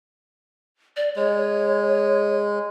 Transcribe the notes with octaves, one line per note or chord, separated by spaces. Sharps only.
D5
G#3 C#5